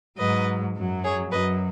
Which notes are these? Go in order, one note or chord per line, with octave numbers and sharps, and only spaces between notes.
G#2 F#3 B4 D#5
F#2 F#3
G#4 C#5
F#2 F#3 B4 D#5